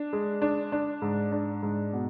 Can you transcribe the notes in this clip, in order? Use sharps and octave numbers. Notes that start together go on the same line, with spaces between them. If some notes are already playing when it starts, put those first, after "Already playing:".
Already playing: D4
G#3
D4
D4
G#2
D4
G#2
B2